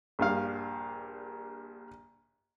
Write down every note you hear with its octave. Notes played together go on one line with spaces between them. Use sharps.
A#1 G2 F5